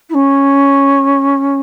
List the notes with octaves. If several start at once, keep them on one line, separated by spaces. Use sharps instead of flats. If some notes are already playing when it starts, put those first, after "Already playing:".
E4
C#4